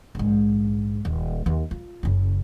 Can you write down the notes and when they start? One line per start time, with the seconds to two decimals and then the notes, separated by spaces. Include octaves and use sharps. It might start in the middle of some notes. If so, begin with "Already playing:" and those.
0.15 A#1 G#2
1.05 D#1
1.46 D#2
1.71 F4
2.03 F#1 C#3